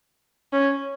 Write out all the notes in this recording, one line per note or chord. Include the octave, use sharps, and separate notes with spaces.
C#4